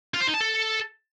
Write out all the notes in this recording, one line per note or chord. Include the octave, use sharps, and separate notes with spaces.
F4
C5
D#4
A5
A4